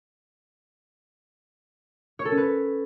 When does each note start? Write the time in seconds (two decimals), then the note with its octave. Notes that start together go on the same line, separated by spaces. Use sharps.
2.19 C#5
2.25 A4
2.31 C#4
2.38 B4